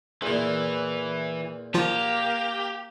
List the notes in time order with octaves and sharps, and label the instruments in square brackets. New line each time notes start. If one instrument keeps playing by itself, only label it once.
[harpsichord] E2 A#2 [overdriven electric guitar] E3
[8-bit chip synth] F3 F4 [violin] A#3 F7 [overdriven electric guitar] G4